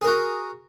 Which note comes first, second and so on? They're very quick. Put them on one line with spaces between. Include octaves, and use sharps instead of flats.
G#4 A#4 F#4